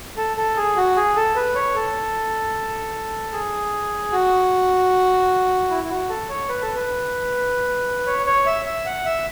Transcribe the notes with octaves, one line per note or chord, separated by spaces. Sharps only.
A4
A4
G#4
F#4
G#4
A4
B4
C#5
A4
G#4
F#4
E4
E4
F#4
A4
C#5
B4
A4
B4
C#5
C#5
E5
E5
F#5
E5